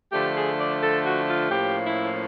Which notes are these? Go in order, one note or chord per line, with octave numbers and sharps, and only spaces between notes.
D3 F3 A3 D4 G4
G#4
D5
A4
F#4
F4
A2 F3 A#3 C#4 G4
E4